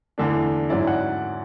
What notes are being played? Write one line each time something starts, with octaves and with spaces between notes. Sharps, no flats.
E2 D3 A3 D4
G#2 F#3 C#4 E4 D5
F#5